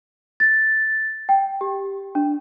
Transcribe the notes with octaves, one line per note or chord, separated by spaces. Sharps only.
A6
G5
G4
D4